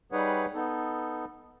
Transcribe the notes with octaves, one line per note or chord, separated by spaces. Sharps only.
G3 D#4 G#4 B4 C#5 F#5
B3 D#4 A4